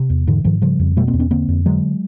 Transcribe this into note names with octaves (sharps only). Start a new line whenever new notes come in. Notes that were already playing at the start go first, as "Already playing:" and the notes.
Already playing: C3
E2
G#2 D3 E3
G#2 D#3 F3
C#3 F3 G3
F2
B2 G3 A3
A#3 C4
E2
B3 C#4
D3 A#3 C4
F2
D3 F#3 G#3